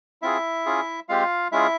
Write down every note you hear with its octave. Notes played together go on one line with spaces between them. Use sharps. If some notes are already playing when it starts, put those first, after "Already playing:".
C4 E4 F4 G#4 E5
C#4 F4 G#4
G#3 C4 F4 G4 F5
G#3 C#4 E4 F4 G#4 E5